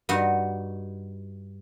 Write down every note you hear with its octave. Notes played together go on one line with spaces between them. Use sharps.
G2 D#4 F#4